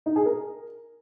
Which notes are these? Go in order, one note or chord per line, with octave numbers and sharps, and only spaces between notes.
D#4
G#4
A#4